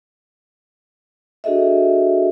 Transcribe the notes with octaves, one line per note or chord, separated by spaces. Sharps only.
D4 F#4 G#4 A4 D#5 E5